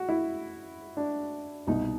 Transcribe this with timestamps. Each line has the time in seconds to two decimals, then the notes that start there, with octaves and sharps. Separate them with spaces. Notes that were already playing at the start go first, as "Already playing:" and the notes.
Already playing: F#4
0.09 E4
0.97 D4
1.67 C2 B2 D#4